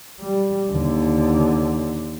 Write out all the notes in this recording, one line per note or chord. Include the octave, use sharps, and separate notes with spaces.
G3
D#2 D3